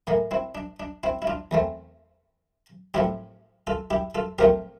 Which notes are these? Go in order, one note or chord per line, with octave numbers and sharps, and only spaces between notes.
A2 E3 A#3
C4 E4
D4
D4
C4 E4
E4
D4 F4
E2 E3 A3 C4
A2 F3 C4 E4 G4
F4 A4
E4 G4
F4 A4
A#2 F3 A3 C4 G4 A#4